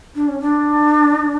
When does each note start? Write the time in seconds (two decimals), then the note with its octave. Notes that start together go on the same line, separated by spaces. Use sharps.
0.15 D4
0.28 C#4
0.40 D4